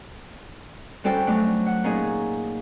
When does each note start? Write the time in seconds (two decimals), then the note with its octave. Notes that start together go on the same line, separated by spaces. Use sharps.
1.04 G3 C#4 F#4 A4 C5 G5
1.27 F#3 A3 D4
1.66 F#5
1.84 A#2 C#4 D#4 G#4